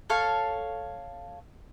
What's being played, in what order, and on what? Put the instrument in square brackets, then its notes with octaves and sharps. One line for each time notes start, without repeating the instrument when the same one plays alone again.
[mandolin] A4 C#5 F5